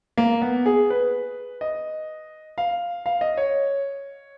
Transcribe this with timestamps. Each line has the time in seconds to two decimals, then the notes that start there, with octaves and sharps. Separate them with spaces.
0.17 A#3
0.42 B3
0.66 G#4
0.90 B4
1.61 D#5
2.58 F5
3.06 F5
3.21 D#5
3.37 C#5